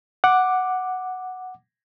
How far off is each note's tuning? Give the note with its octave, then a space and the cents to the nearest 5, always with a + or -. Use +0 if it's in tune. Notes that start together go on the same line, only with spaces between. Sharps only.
F#5 +0 D6 +5